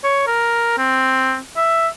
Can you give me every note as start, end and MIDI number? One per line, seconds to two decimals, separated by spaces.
0.04 0.25 73
0.27 0.73 70
0.78 1.38 60
1.57 1.88 76